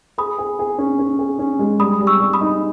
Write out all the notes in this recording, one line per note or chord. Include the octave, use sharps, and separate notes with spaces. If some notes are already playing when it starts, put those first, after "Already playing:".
G#4 B5 D#6
G#4
G#4
C#4
C#4
G#4
C#4
G#3
G3 B5 D#6
G3
C#6 E6
G3
B5 D#6
D#4